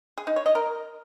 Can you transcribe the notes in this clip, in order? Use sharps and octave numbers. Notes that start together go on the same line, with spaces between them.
G#4
D#4
C#5
D#5
A#4